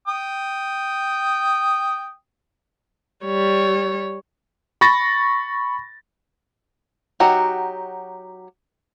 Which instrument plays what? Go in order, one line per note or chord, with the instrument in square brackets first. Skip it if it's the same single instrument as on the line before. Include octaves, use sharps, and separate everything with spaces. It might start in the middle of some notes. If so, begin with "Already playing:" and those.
[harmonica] G5 D#6
[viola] G3 C#5
[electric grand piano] B5 C#6 A6 A#6
[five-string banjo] F#3 D#4 F#4 G4